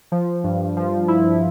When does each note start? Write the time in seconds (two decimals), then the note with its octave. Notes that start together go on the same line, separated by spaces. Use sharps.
0.12 F3
0.44 G2
0.77 F3
1.08 E4